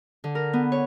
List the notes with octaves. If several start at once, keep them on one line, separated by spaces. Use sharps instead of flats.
D3
A#4
B3
C#5